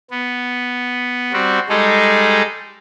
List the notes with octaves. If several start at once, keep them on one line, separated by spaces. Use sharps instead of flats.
B3
G3 C4 F#4
G3 G#3 D#4 G#4 A4